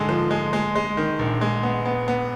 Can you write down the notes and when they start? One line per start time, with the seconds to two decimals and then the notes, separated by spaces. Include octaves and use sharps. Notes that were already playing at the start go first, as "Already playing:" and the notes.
Already playing: G#2 D3 G#3
0.09 F3
0.31 G#3
0.53 G#3
0.75 G#3
0.97 D#3
1.19 A#1
1.41 G#3
1.63 B3
1.86 B3
2.08 B3